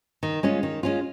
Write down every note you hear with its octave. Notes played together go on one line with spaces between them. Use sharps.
D#3
G#3 C#4 F4
D#3
G#3 C#4 F4